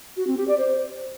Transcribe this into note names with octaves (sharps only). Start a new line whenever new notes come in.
F#4
C4
G4
D5
C5